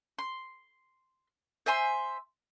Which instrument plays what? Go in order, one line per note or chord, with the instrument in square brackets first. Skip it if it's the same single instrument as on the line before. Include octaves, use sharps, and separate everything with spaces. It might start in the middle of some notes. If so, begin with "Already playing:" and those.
[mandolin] C6
C5 E5 G#5 C6